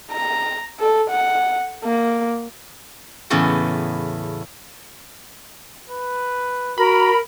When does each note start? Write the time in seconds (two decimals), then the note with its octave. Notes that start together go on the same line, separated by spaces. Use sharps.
0.11 A#5
0.80 A4
1.10 F#5
1.84 A#3
3.30 E2 A2 C#3 B3
5.90 B4
6.78 F#4 A#4 B5